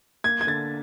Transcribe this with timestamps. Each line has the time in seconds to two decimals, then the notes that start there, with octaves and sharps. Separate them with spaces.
0.24 A#3 G#6
0.41 G#6
0.47 D3 A6